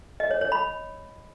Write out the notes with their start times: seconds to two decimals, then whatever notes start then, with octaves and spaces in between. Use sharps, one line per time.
0.20 D#5
0.31 C#5
0.41 C#5
0.52 B5